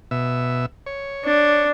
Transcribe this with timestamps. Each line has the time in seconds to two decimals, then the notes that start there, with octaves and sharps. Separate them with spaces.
0.11 B2 E5
0.86 C#5
1.24 D4